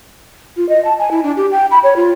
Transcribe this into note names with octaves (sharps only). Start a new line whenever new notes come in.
F4
D#5
A5
G#5
E4
D4
G4
G5
B5
C#5
F4